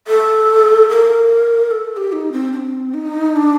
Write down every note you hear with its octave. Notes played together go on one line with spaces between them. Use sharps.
A4
A#4
A4
A4
G4
D#4
C4
D4
C4
D#4
D4